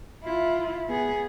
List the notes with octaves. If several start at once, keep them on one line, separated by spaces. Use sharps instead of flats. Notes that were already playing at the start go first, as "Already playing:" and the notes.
E4 F4
B3 G#4